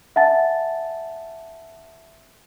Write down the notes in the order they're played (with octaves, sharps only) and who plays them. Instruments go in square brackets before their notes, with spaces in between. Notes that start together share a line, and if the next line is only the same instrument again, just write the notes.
[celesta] E5 F#5 G#5 A5 A6